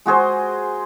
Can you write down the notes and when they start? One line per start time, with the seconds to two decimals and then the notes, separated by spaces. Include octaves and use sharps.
0.06 G#3 F#4 G#4 C5